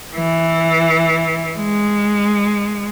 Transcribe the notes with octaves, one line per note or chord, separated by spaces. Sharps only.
E3
G#3